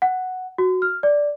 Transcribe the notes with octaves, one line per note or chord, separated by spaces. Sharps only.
F#5
F#4
F6
D5